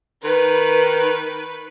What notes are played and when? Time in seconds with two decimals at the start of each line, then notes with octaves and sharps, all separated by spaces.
0.24 D#3 B4